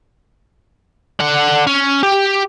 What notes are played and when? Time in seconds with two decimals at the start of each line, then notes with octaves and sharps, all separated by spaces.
1.19 D3 F#5
1.67 C#4
2.03 G4